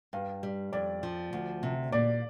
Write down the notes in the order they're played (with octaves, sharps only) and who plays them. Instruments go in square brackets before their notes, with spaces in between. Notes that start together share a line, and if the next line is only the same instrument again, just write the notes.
[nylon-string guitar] G2 [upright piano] F5
[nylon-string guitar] G3
[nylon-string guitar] F2 [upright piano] D5
[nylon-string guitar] F3
D2
C3
[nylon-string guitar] A#2 [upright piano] D5